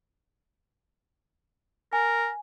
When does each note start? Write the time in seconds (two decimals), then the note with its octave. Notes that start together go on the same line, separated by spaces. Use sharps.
1.93 A#4 G#5